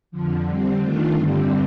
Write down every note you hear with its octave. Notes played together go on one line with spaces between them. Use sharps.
F2 D3 F3
D3 G3 C4
D#3 A3 D4 F4
G2 D3 G3 C4